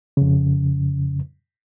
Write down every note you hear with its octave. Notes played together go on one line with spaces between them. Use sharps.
F2 C#3